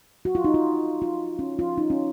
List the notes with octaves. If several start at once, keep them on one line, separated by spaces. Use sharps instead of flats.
F#4
F4
D#4
F4
F4
C#4
F4
D#4
C#4